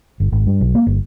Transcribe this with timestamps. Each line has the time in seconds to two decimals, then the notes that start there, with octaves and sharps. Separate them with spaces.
0.20 G1
0.32 G#1
0.46 G2
0.61 B1
0.75 A#3
0.86 G1